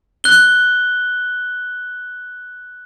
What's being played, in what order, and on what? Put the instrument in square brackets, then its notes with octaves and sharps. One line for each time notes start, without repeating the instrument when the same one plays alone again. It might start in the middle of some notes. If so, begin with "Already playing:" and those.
[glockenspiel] F#6 G7